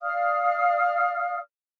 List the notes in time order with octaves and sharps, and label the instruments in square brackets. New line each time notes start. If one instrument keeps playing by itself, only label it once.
[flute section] D5 F5 D#6 F6